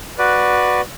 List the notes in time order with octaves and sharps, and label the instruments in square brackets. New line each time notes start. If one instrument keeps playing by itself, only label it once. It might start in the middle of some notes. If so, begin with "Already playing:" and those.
[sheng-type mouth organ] F#4 B4 D5